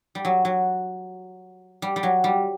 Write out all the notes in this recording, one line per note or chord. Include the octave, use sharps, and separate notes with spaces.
G3
F#3
F#3
G3
G3
F#3
G3